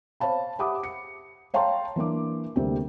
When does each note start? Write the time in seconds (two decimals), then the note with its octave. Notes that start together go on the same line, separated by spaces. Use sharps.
0.20 C5 C#5 F5 A5 B5
0.59 G4 E5 F#5 B5 D6 D#6
0.83 C#7
1.54 C#5 F5 G5 A5 A#5 C6
1.96 E3 A#3 D4 D6
2.56 D2 C3 G3 A#3 C4